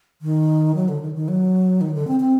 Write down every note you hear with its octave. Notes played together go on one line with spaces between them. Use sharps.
D#3
F#3
D3
D#3
D#3
F#3
D#3
D3
C4
C4